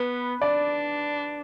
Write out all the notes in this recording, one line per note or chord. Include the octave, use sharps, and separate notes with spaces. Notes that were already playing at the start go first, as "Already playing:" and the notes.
Already playing: B3 B4
D4 D5